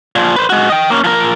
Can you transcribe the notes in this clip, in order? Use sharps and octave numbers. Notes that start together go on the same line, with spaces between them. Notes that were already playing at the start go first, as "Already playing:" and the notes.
A#2 F3
B4 C5
G#3 F#4
D#5 G5
A#3 C#4
F3 A#4